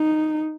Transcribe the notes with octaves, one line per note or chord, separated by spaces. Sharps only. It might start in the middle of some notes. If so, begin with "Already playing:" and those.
Already playing: D#4